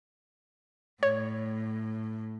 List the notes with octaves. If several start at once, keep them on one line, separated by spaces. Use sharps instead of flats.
A2 C#5